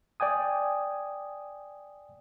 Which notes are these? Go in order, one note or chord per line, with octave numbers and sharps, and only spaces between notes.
D5 G5 G#5 D#6